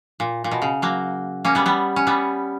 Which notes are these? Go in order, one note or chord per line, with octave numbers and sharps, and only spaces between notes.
A#2
A#2
B2
C#3
F#3 A#3
A#3 C#4
G3 B3
G3 B3
C#4
G3 B3